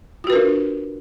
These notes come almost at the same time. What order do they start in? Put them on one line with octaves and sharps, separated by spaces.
F4 F#4 B4 A#4 D4